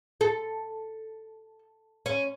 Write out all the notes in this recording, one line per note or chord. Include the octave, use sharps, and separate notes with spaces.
A4
C#4